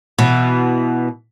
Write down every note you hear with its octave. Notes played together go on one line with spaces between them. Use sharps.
B2 E3